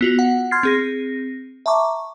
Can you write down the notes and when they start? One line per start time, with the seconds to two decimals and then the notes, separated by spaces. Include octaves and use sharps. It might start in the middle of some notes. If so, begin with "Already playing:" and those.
0.01 B3 F4 F#4
0.19 F#5
0.51 C6 F6 G#6 A6 C7
0.63 C4 G#4 A#6
1.66 E5 A5 A#5 C#6 D6